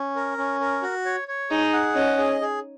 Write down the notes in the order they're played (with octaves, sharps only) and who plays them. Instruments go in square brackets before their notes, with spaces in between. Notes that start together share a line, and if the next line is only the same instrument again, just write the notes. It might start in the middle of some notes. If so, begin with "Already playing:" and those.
Already playing: [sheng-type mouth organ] C#4
A#4
C#4
A#4
F#4
C#5
C#5
[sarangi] D#4 [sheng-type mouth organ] G#4
[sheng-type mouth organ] F#5
[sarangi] C#4 [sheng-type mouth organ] D#5
[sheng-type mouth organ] G#4
G#4